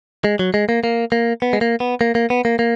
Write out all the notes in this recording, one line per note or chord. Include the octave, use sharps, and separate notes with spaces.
G#3
F#3
G#3
A#3
A#3
A#3
B3
G#3
A#3
B3
A#3
A#3
B3
A#3
A#3